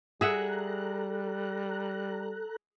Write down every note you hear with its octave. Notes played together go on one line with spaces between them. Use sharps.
G3 G#4 A4 E5 F#5 A#5 F#6